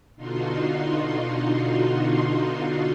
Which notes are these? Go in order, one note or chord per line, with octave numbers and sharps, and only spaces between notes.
B2 D3 D#4 F4 F#4 C6